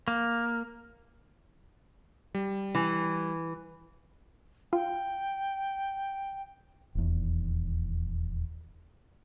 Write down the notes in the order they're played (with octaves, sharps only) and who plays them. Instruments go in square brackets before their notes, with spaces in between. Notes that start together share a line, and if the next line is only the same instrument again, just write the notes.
[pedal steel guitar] A#3
[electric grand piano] G3
[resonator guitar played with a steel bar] E3
[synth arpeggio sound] F4 [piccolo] G5
[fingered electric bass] D#1 E2